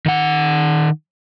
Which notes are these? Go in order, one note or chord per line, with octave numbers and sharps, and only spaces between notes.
D#3 F#5